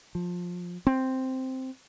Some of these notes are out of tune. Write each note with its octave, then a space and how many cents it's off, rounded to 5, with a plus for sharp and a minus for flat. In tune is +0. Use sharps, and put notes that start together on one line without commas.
F3 +20
C4 +0